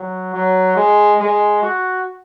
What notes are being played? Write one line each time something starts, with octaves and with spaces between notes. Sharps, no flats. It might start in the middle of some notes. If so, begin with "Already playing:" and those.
Already playing: F#3
F#3
G#3
G#3
F#4